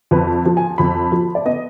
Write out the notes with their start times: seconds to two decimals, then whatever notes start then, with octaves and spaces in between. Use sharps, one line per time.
0.11 F2 B4
0.46 F3
0.57 G#5
0.78 F2 B5
1.12 F3
1.35 D5
1.45 B3 D#5